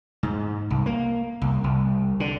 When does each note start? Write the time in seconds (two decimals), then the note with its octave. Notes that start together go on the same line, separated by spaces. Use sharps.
0.23 G#2
0.70 C2
0.86 A#3
1.41 C2
1.64 C2
2.20 D3